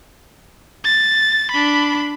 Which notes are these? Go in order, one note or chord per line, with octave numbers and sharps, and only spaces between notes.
A6
D4 B5